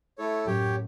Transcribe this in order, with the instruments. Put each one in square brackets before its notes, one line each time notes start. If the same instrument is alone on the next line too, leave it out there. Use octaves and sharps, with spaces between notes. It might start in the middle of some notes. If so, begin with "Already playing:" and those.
[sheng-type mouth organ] A3 E4 A4 C#5
[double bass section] F#2 A2 [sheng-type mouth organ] G4 C#5 G5